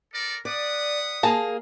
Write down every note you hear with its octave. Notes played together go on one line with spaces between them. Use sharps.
A4 A#4 D5
B4 D5 F#5 D#6
A#3 G#4 A5 A#5